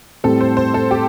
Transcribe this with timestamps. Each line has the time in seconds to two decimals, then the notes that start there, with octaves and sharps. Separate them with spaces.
0.24 A2 G3 C4 A4
0.41 C5
0.57 C5
0.74 A4
0.91 G4